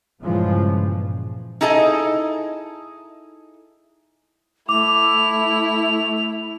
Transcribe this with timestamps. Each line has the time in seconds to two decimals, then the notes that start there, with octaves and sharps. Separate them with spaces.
0.23 G2 A#2 C#3 E3 F3 G#3
1.61 D#4 E4 G#4 A4 D#5
4.69 A3 E4 D6 F7